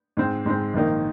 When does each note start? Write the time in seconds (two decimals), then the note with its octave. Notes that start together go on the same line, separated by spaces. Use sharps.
0.17 G#2 G#3 C4
0.46 G#2 G#3 C4
0.74 A#1 G#2 D#3 A#3 D#4